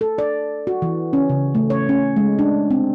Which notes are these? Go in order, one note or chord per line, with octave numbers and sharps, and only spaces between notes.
A4
D5
F#4
E3
C#4
C#3
A3
C#5
C#4
G#3
D4
C4